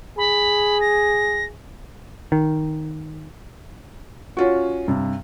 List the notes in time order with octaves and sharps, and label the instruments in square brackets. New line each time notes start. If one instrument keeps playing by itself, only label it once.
[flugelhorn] G#4 [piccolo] B5
[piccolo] A#6
[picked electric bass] D#3
[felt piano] C#4 F4 F#4
G2 C3